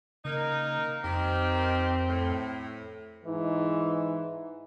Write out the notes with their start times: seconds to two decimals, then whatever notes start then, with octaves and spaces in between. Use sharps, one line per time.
0.25 C#3 A#3 D#4 A#4
1.04 F2 D#3 C4 G4
2.08 A2
3.25 G#2 E3 D#4